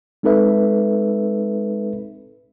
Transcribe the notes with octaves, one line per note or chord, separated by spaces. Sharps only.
G#3 C4 D#4 A4 B4 E5